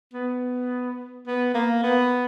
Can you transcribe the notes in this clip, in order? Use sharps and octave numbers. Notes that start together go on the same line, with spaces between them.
B3
B3
A#3
B3